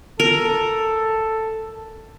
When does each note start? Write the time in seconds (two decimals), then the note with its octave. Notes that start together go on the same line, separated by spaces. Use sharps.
0.20 A4 A#4